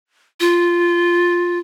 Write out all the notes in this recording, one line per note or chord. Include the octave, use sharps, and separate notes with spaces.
F4